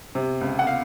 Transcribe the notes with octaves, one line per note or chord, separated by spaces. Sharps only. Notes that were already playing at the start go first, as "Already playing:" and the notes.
C3
C#2
F#5
F5